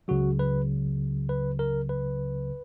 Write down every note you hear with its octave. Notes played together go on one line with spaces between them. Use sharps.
C#2 C#3 F#3 F#4
B4
B4
A#4
B4